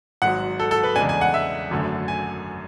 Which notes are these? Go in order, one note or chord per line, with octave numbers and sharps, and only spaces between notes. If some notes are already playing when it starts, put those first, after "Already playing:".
G#1 G#2 F#3 F#5
A4
A4
B4
E2 C#3 G#3 D4 G#5
G#5
F#5
E5
G#1 F#2 D3 A3
G#5